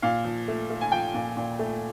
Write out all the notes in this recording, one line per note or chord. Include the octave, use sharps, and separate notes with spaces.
A#2 F5
F3
A3
A3
G#5
F3 G5
A#2
A#2
A3